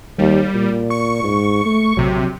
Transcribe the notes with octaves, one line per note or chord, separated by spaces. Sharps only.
D#2 G3
A#2
C#6
G#2
A3
A#1 C3 F#3